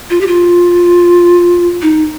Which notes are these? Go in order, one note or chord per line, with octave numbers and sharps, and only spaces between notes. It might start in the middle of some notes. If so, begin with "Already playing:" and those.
F4
G4
F4
D#4